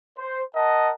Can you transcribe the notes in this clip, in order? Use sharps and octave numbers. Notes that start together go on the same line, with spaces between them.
C5
A#4 D#5 F#5 A5